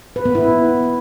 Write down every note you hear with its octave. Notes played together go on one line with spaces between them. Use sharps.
B4
B3
E4